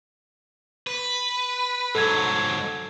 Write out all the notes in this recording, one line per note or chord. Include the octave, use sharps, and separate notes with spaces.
B4
G#2 F#3 A4 G#6